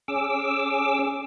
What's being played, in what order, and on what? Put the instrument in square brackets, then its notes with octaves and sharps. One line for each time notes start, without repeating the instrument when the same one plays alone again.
[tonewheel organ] C#4 G#4 D6 E6